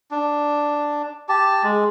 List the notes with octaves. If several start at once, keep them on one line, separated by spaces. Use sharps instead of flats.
D4
G4 A5
G#3